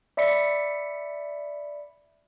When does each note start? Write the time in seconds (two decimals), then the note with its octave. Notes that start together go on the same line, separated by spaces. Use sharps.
0.17 D5 E5 B5 B6 C#7